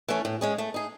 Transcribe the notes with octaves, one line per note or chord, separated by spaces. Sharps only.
E3 A3 C#4
A2
G#3 C#4 G#4
A3
D#4 G#4